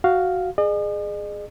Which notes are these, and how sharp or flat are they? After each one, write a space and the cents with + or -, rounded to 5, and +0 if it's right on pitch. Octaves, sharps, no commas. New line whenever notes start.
F#4 +5 F5 +0
G#4 +0 D#5 -45